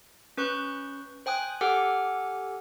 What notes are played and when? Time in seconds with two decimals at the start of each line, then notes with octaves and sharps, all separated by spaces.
0.37 C#4 B4 C#6 F#6 G6
1.26 C5 G5 G#5 D#6 F#6
1.61 G4 A4 F#5 G#5 D6 F6